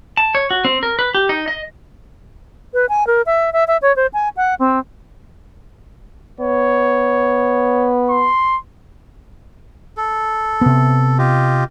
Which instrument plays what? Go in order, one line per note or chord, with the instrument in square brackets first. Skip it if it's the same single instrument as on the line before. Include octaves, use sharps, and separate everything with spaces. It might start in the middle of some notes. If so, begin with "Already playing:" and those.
[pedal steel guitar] A5
C#5
F#4
C4
A#4
B4
G4
D#4
D#5
[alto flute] B4
G#5
A#4
E5
E5
E5
C#5
C5
G#5
F#5
C4
[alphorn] B3 [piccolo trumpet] C#5
[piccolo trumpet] C6
[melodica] A4
[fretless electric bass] C3 B3
[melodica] F4 G4 D#5